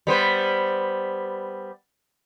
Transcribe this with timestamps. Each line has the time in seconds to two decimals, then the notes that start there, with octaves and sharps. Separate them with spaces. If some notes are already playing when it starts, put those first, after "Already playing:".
0.07 G3 B3 C5